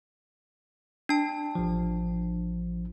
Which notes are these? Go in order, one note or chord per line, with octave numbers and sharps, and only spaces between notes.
D4 A5
A1 F3